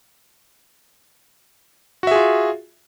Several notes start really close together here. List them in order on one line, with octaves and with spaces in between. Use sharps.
F#4 E5 G#4 F4